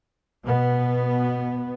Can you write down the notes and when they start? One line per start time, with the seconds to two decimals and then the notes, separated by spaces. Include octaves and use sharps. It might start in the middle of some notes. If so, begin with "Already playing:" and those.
0.44 B2 B3